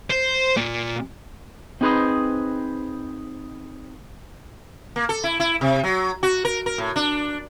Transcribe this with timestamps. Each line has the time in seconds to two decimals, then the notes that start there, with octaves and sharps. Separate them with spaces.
0.10 C5
0.57 A#2
1.81 C4 D#4 G#4 B4 C5 D#5
4.96 A#3
5.09 A4
5.24 E4
5.40 E4
5.61 C3
5.84 F#3
6.23 F#4
6.45 A#4
6.66 A#4
6.78 A2
6.96 D4